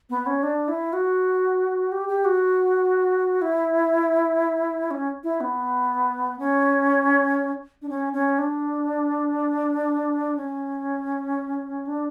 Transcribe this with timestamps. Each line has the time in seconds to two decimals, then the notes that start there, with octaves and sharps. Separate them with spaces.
0.10 B3
0.26 C#4
0.43 D4
0.68 E4
0.93 F#4
1.92 G4
2.09 G4
2.25 F#4
3.41 E4
4.91 C#4
5.24 E4
5.41 B3
6.39 C#4
7.82 D4
7.89 C#4
8.13 C#4
8.38 D4
10.37 C#4
11.87 D4